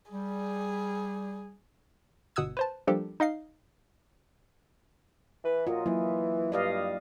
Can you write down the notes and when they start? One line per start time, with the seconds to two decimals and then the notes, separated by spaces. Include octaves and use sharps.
0.11 G3 G#4
2.36 G1 B2 F#5 D#6 E6 G#6
2.57 B4 C5 A5
2.87 F3 G3 A#3 D4 G4 A4
3.20 D#4 D#5 F5 C7
5.43 E3 B4
5.67 A#2 F#3 F4 D#5
5.86 E3 F#3 A#3 E4
6.52 G2 D5 D#5 F5